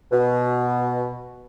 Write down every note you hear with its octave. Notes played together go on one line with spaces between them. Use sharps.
B2